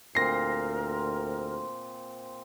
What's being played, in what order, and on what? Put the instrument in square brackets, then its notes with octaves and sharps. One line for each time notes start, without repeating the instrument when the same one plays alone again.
[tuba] D2 [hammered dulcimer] A#2 C4 G#5 [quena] A#4 [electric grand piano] A#6 C7